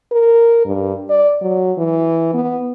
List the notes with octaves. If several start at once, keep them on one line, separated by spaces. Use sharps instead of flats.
A#4
G2
D5
F#3
E3
B3